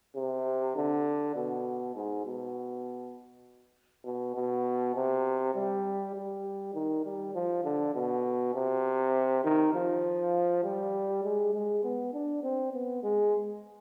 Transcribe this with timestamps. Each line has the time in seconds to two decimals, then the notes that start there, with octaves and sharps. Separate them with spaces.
0.16 C3
0.76 D3
1.35 B2
1.95 G#2
2.25 B2
4.05 B2
4.35 B2
4.95 C3
5.55 G3
6.15 G3
6.74 D#3
7.04 G3
7.34 F3
7.64 D3
7.94 B2
8.54 C3
9.44 D#3
9.74 F3
10.64 G3
11.24 G#3
11.53 G#3
11.84 B3
12.13 D4
12.43 C4
12.73 B3
13.03 G#3